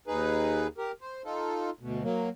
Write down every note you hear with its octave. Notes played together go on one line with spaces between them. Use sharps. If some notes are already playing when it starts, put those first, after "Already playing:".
D#2 D#4 G#4 B4
G4 A#4
C5
D#4 F4 A4
D2 B2
F#3 A#3